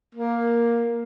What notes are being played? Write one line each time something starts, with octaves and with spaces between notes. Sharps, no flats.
A#3